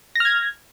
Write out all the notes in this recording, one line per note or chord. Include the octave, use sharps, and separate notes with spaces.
F6 G#6 A#6